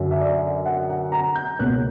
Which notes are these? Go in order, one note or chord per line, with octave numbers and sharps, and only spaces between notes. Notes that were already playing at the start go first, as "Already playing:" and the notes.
Already playing: F#2 D3 F#3
E5
D5
F#5
F#5
A#5
G6
C#2 B2 A#3 C#4 F#6